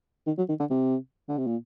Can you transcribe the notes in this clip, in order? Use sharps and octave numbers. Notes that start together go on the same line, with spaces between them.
D#3
F#3
D#3
D3
C3
D3
C3
A#2